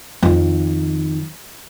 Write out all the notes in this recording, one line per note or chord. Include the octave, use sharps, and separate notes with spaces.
F2 D#3